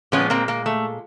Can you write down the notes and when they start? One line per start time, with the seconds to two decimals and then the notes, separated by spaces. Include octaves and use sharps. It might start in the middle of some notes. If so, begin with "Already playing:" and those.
0.12 A#2 F3 G#3 B3 C#4
0.30 A#3 C4
0.48 A#3
0.66 A3